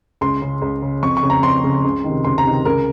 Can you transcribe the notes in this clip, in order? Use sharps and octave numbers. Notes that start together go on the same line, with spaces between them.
C#2 C6
C#3
C#2
C#3
F2 C#6
C#6
C#3
A#5
F2 C6
C#3
C#2
C3 D#3
C#2 C6
A#5
C3 D#3
C#2 A#4